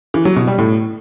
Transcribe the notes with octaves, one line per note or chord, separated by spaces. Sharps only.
E3
F#3
B2
G3
A2